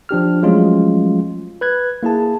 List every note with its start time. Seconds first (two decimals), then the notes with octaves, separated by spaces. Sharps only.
0.09 F3 D4 G4 F6
0.42 F3 F#3 G#3 A3 C#4 F4
1.61 B4 F#6 G#6
2.03 A#3 E4 G#4 A5